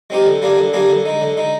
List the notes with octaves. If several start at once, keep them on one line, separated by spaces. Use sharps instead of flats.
G#3 C4 D#4 G4
D3
G3 A#3 D4 G#4
D3
G3 A#3 D4 G#4
D3
G#3 D#4
D3
G#3 D#4